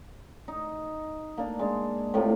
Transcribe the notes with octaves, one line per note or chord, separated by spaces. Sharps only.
D#4
A#3 D4
G#3 D4
A2 C3 A#3 F4